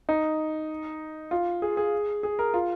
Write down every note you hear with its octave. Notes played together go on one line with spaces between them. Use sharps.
D#4
F4
G#4
G#4
G#4
A#4
F4